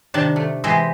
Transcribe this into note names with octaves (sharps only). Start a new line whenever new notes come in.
C3 D#3 D4 A5
A3
E3 G#3 G4 C5 D#5 E5